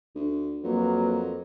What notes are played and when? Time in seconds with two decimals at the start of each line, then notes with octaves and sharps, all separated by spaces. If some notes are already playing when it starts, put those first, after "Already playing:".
0.16 D2
0.64 F2 F#3 A#3 B4